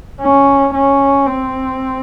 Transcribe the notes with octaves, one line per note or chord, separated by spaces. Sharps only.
C#4
C#4
C4